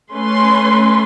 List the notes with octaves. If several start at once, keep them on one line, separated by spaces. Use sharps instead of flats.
A3 C#4 B4 C6